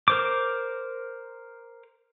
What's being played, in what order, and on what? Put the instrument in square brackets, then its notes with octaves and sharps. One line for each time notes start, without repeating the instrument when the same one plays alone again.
[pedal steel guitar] A#4 C5 D6